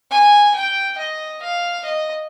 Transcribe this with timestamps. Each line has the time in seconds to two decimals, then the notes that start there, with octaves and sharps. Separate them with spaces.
0.11 G#5
0.55 G5
0.98 D#5
1.42 F5
1.85 D#5